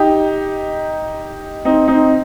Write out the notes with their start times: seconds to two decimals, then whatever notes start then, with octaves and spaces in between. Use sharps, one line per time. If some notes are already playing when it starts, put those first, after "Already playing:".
Already playing: D#4 G4
1.65 C4 D#4
1.88 C4 D#4